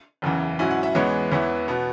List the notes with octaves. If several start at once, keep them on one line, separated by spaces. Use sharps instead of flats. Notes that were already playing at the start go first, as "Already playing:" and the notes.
F#1 E2 C#3 E3
G#2 F#3 C#4 E4 G#5
F#5
E5
E2 E3 G#3 B3 C#5
E2 E3 B3 E4 C#5
B2 B3